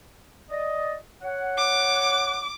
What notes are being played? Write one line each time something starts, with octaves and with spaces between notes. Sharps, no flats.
D5 D#5
C#5 F#5
D6